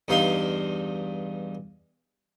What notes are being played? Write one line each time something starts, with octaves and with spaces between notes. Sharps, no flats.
E2 G2 D#4 F5 C6